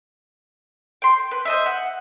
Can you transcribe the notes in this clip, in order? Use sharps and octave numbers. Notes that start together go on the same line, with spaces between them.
G5 C6
B4
C5 D#5 E5
F#5